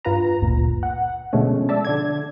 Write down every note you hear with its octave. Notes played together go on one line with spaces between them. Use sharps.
G2 F4 B4 A#5
G1 D2 A#2
F#5
B2 D3 F3 G#3 A3 C#4
D5 E5 A5
D3 D5 G#6